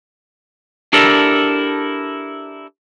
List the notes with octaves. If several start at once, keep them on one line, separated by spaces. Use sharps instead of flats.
D4 E4 G4 A4 A#4 D5